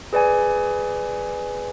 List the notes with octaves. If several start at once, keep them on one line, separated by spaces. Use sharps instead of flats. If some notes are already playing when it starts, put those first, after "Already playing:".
G#4 B4 D5 G#5